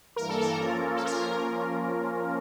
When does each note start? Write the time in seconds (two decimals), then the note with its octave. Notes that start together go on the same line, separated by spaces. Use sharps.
0.16 G2 E3 A#3 A#4
0.29 A4
0.41 A#4
0.56 F3 A#3 C#4 F4
0.96 A4
1.06 A#4